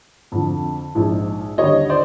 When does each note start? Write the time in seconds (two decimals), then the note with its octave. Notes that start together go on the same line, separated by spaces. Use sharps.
0.32 F2 D3 F3
0.95 A#1 G#2 F3
1.58 D#2 D3 G3 C#5 D#5
1.90 C5 D5